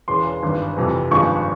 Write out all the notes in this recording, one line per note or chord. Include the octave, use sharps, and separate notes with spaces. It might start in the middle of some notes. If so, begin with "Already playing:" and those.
E1 E2 C#3 E3 C6
G#1 G2 E3
F2 C3 E3
G#1 G2 F3 G#3 C#6